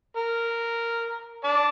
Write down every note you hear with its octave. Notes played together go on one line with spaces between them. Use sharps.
A#4
D5 A5